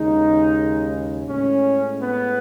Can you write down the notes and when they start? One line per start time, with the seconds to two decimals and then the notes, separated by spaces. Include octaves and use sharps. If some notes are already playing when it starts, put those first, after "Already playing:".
Already playing: D#2 C#3 G#3 D#4
1.28 A2 G#3 C#4
2.01 B3